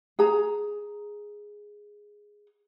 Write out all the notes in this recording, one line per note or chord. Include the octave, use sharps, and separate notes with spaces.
G#4 A#5